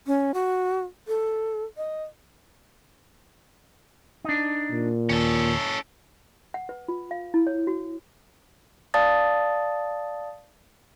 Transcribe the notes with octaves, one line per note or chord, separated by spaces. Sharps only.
C#4
F#4
A4
D#5
D4 D#4
A#2
D#2 C#4 A4
F#5
B4
F4
F5
E4
C#5
F#4
D5 F5 A5 D#6 A6